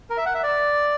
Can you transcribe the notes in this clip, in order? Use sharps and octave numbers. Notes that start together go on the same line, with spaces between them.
A#4
E5
F#5
E5
D5